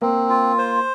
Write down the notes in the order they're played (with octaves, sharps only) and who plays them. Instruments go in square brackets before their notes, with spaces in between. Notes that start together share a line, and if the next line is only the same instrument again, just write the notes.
[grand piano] A#3 [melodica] C4
[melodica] F4
C5